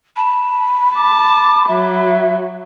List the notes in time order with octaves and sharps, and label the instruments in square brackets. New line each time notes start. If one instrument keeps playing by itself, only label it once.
[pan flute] A5 [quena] B5
[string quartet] A5 [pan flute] D6
[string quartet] F#3 [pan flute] E5